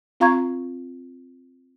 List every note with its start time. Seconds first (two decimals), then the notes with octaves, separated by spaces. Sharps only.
0.20 C4 F4 F5 A#5 C#6 G#6